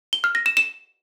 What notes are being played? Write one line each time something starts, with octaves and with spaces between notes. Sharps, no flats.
G7
F6
A#6
E7
E7